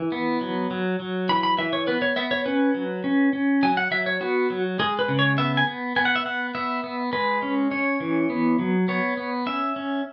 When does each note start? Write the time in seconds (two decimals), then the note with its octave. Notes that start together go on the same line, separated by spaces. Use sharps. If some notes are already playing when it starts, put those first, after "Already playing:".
Already playing: E3
0.12 B3
0.41 F#3
0.71 F#3
1.00 F#3
1.29 E3 B5
1.43 B5
1.58 E3 E5
1.73 C#5
1.87 B3 B4
2.02 C#5
2.16 B3 E5
2.31 C#5
2.46 C#4 B4
2.74 F#3
3.04 C#4
3.33 C#4
3.63 F#3 G#5
3.77 F#5
3.91 F#3 E5
4.06 C#5
4.21 B3 F#4
4.50 F#3
4.79 G#3 G#4
4.99 B4
5.08 C#3
5.19 C#5
5.38 B3 E5
5.57 G#5
5.67 B3
5.96 B3 G#5
6.05 F#5
6.16 E5
6.25 B3 F#5
6.55 B3 E5
6.84 B3
7.13 G#3 B4
7.42 C#4
7.71 C#4 C#5
8.00 E3
8.30 B3
8.59 F#3
8.88 B3 C#5
9.17 B3
9.46 C#4 E5
9.76 C#4